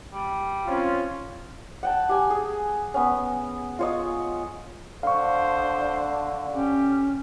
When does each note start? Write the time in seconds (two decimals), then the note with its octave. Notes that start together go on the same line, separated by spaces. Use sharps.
0.12 G3
0.66 C4 C#4 F4
1.83 F#5 G5 A5
2.09 G4 G#5
2.30 G#4
2.94 B3 C#4
3.79 F4 C#5 D#5
5.03 D3 D4 C5 F5 C#6
6.53 C#4 G4